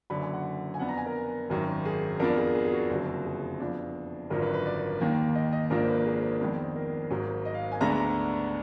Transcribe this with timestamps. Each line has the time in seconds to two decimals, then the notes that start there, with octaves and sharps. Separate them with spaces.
0.10 F#1 F#2 D3 B5
0.22 G#5
0.33 F#5
0.74 G#5
0.79 F2 F3 B3 D4 F#5
0.89 A#5
0.97 G#5
1.06 A#4
1.50 G#1 F#2 D#3 F#3
1.85 G#4
2.20 F2 F3 B3 D4 A#4
2.37 G#4
2.55 G#4
2.65 G#4
2.72 F#4
2.90 F#1 F2 D3 F#3
3.25 G#4
3.60 F2 F3 B3 D4
4.30 G#1 F#2 D3 F3 A#4
4.42 B4
4.53 B4
4.66 D5
5.00 D#2 D#3 A#3
5.35 D#5
5.53 D#5
5.70 G#1 G#2 F3 A#3 D4 A#4
5.88 B4
6.06 G#4
6.40 F2 D#3 G#3 B3 D4
6.76 A#4
7.11 G#1 G#2 F#3
7.45 D#5
7.54 F5
7.72 G#5
7.81 D2 D3 G#3 B3 D4 A#5
7.92 A#5